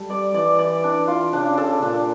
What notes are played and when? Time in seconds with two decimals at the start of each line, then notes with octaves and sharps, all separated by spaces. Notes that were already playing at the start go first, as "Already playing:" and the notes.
Already playing: G3 A4
0.10 D5
0.34 E3 D5
0.58 D5
0.84 D4
1.08 F4
1.33 C#3 D4
1.58 A4
1.82 A#2 D4